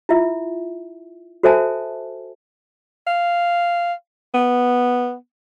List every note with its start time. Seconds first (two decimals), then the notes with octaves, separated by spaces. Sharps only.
0.09 E4 F4 E5
1.43 F#4 A4 C5 E5 G#5 A5
3.07 F5
4.34 B3